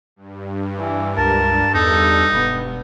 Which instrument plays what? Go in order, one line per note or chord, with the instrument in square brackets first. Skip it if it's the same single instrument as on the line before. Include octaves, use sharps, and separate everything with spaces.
[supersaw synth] G2
[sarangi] E3
[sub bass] C#2 [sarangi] A#4 [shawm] A5
[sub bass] E2 [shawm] D#4 [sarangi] A4
[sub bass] E1 [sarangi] B3